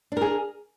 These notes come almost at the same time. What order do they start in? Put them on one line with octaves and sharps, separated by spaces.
D4 A#4 G#4